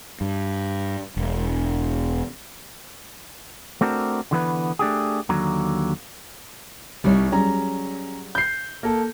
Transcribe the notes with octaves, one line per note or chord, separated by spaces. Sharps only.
G2
E1
A3 C4 D4 F#4 A#4
D3 E3 B3 B4
A3 D4 G4 G#4
D#2 D3 F#3 A#5
C2 G3 D#4 C#5
F#3 G3 C#4 G#4 A#5
G6 C7
A#3 A4